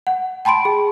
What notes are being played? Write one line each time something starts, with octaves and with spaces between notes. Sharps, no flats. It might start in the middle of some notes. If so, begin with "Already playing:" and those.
F#5
G5 A5 B5 C6 D7
G#4